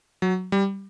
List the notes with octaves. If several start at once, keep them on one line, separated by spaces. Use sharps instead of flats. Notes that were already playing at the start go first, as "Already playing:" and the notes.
F#3
G3